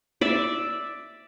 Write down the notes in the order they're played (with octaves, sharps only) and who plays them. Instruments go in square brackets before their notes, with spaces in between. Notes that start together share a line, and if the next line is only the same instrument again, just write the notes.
[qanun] D5 E5